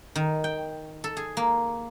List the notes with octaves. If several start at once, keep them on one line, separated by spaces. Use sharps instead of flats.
D#3
G5
A4
G#4
A#3